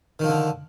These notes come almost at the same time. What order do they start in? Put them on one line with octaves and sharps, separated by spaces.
D#3 F3 D3